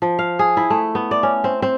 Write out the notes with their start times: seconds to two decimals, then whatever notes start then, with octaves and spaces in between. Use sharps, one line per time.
0.02 F3
0.19 F5
0.39 G#4
0.57 E4
0.70 A3
0.95 B3
1.11 D5
1.23 C#4
1.44 C4
1.62 C4